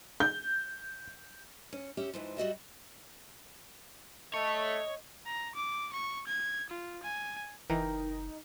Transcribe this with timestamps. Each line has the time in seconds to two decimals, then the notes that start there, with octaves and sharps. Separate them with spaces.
0.20 G6
1.73 C#4
1.97 C#4 G4 E5
2.14 G#2 E3 F3
2.37 G3 F#4 D#5 E5
4.34 A3 C#5 D#5
5.26 A#5
5.55 D6
5.93 C#6
6.27 G#6
6.70 F4
7.03 G#5
7.70 F#1 E3 D#4 A#4 G5 A#5